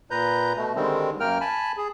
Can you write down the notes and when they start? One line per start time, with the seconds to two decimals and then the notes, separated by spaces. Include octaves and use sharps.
0.11 A#2 B4 A#5 G6
0.57 B2 A3
0.75 D3 D#3 G3 G#3 C4
1.20 F#2 A#3 A#4 G5 F6
1.41 G#5 A5 B5
1.77 G#4